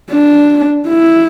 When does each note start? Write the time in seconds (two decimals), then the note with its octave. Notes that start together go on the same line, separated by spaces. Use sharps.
0.11 D4
0.88 E4